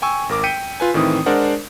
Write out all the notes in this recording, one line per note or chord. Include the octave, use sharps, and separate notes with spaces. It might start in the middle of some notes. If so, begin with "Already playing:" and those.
G5 G#5 C#6 E6
G#1 A#4 D6
G5 G6 B6 C#7 D#7
F4 B4 G#5
A2 D#3 E3 C4 D#6
G#3 D4 A#4 C5 D5 F#5